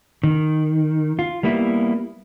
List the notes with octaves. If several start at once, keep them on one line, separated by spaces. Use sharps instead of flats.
D#3
F4
G3 A#3 B3 E4